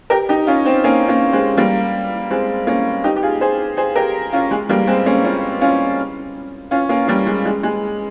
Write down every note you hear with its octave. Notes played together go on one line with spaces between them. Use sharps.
G4 A#4
D#4 G4
C#4 F4
C4 D#4
A#3 C#4
A#3 C#4
G#3 C4
G3 A#3
G#3 C4
A#3 C#4
D#4 G4
G4
F4 G#4
G#4 C5
G#4 C5
G4 A#4
C#4 F4
G#3
G3 A#3
G#3 C4
A#3 C#4
C#4 F4
C#4 F4
C#4 F4
A#3 C#4
G3 A#3
G#3
G#3
G#3